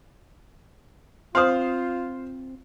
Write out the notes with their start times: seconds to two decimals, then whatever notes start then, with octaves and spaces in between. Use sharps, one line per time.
1.35 C4 F4 C5 F5 C6 D#6